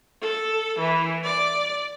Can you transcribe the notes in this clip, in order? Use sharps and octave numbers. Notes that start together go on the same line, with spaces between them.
A4
E3
D5